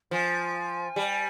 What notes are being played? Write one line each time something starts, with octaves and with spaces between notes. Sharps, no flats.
F3 G#5
G3